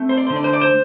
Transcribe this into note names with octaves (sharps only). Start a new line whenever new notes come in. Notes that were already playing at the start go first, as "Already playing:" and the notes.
Already playing: A3 C4
C5
D5
D3 C5
D5
C5
D5
C5